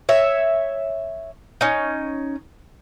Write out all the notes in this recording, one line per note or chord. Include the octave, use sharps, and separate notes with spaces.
C#5 E5
C#4 D#4